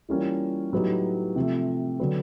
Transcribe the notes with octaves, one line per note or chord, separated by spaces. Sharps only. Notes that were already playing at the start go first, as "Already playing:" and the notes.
E3 G3 A#3 C#4 F4
A2 F#3 B3 D#4 G4
C3 F3 A3
D3 F#3 B3